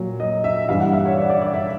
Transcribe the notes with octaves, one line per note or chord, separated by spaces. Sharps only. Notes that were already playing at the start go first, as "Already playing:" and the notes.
Already playing: A#2 F#3
D#5
E5
G2 E3 G3 F5
F#5
E5
C#5
D5
D5
D5
E5